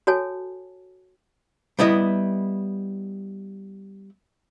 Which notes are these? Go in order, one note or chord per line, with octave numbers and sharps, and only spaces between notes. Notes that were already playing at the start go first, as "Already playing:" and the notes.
F#4 A4 C#5 G#5 A5
G3 B3 E4 D#5